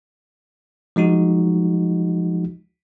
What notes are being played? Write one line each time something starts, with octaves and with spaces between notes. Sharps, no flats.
F3 G#3 D#4 F#4